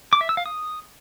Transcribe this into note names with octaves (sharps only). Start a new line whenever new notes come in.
D6
E5
E6
F5
D#6